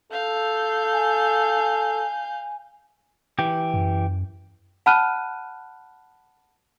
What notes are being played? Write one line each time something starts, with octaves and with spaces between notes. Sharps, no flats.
A4 F5 G6
G#5
E3 G4
F#2
F#5 A5 B5 F6 F#6 D#7